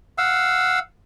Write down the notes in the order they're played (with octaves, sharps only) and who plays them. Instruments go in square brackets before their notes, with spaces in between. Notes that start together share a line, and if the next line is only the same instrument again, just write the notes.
[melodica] F5 F#5 E6